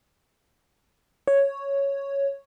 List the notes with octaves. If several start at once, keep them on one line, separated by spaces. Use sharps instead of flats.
C#5